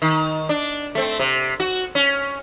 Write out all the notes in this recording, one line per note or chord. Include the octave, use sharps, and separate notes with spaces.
D#3
D4
A3 C4
C3
F#4
C#4